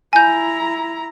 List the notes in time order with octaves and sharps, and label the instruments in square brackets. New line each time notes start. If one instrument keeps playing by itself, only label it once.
[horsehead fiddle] E4 A#5 [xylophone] G#5 G6